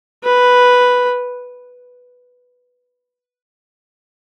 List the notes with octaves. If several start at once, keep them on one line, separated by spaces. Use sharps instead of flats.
B4